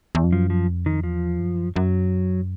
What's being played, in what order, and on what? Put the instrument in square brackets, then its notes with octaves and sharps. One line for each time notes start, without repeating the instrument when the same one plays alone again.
[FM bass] E2
F2
[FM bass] F#2 [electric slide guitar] F3
[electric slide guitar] F3
[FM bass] F2
[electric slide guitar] D#3
[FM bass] E2 [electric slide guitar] F3
[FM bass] F#2
[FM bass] F#2 [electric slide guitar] F#3